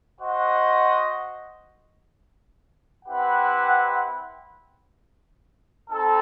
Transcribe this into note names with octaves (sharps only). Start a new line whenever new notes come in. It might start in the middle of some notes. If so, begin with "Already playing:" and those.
F#4 C5 D#5 F#5
C4 E4 G4 B4 F#5
C4 D#4 A4